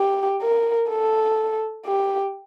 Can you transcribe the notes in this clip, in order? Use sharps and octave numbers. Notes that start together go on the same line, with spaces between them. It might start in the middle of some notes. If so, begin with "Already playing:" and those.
Already playing: G4
A#4
A4
G4